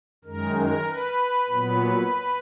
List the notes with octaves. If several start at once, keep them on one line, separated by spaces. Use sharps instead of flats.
F#2 D#3 G#3 A#4
A#4
B4
A#2 F#3 B3